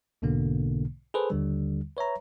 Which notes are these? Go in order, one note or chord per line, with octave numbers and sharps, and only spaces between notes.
B1 G#2 B2 D3 A#3
G#4 A4 B4 C5
D#2 D3 G3
B4 C#5 E5 A#5